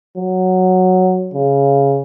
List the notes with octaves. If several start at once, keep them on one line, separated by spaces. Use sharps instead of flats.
F#3
C#3